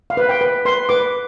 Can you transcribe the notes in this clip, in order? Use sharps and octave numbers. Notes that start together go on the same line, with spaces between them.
F5
B4
G5
B4
B4 C6
B4 D6